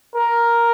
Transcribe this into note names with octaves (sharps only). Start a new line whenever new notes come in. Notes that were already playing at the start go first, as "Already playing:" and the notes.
A#4